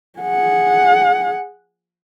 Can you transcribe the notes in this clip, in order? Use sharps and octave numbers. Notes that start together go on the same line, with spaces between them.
G#4 F#5